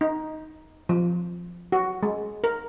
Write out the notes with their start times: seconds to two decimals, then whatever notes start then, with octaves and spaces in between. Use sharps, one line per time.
0.01 D#4
0.89 F3
1.72 F#4
2.03 G#3
2.44 A#4